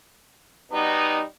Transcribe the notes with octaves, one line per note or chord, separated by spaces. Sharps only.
B2 G3 B3 D#4